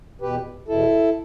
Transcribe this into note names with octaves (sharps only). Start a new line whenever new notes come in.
E2 B2 G4 B4
E2 B2 E4 A4